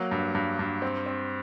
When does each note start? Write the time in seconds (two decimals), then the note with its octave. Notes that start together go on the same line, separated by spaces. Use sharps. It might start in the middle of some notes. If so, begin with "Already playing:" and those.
Already playing: F#3 A#3
0.11 G2
0.35 G2
0.59 G2
0.82 C4
1.06 C4